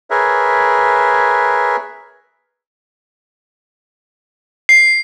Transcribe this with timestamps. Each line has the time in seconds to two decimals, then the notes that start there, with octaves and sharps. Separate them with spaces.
0.10 G#4 A#4 B4 C#5 E5
4.69 C7